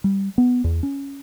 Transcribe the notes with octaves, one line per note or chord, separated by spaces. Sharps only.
G3
B3
E2
C#4